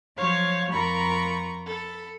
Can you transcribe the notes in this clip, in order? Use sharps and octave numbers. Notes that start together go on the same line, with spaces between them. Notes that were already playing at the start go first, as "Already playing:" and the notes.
F3 F#3 C5 C#5 F5
F2 F4 A#4 A#5 B5 C#6
A4 B5